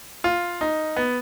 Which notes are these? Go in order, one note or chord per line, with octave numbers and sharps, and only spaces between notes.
F4
D#4
B3